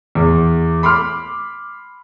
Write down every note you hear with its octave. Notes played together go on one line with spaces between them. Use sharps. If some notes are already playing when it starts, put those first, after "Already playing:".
E2
B5 C6 D6 F6